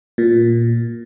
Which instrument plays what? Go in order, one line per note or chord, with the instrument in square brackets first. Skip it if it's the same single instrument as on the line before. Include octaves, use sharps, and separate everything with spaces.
[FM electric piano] A#2